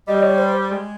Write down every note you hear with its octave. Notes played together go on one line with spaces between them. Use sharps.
G3 D#5
C#5
C5
G#3